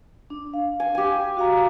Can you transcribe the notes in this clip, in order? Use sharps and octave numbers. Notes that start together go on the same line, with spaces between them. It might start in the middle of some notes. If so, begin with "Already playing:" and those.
D4
F5
G#5
G4 G#5
F#4 F5 A#5